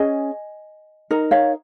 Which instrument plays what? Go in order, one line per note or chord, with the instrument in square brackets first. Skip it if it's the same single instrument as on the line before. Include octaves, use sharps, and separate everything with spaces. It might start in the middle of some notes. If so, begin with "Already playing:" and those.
Already playing: [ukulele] C#4 G#4 D#5 G#5
D#4 A#4
C#5 F5